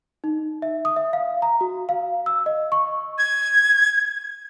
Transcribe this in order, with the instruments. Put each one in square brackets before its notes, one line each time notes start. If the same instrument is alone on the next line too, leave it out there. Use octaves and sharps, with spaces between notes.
[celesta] D#4
E5
D#6
E5
F5
A#5
F#4
F5
E6
D#5
C#6
[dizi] G#6